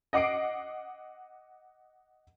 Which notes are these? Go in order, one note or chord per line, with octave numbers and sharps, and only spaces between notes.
D#5 F#5 D6 C7 D7